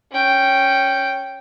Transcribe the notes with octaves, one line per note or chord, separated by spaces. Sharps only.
C#4 G5